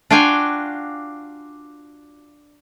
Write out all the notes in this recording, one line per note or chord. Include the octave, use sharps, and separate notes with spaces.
D4 F4 F#4 F5 G5 G#5